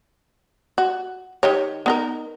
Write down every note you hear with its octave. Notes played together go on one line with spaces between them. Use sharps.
F#4
D#3 G4 C#5
B3 D#4 A#4